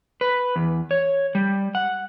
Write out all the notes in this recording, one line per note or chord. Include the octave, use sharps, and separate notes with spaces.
B4
E2
C#5
G3
F#5